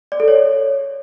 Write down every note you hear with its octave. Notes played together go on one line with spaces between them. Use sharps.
D5
A4
C#5